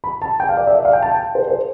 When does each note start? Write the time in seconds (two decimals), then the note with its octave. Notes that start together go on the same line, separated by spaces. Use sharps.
0.04 B5
0.22 A5
0.40 G5
0.49 F5
0.57 D5
0.67 E5
0.76 D5
0.85 F5
0.93 G5
1.02 A5
1.12 G5
1.35 C5
1.48 C5